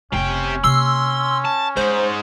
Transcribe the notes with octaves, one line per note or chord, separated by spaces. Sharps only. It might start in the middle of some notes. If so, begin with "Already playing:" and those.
F1 C3 B3 C#4 G5
C3 A#3 C6 E6
A5
G#2 G#3 D#4 C5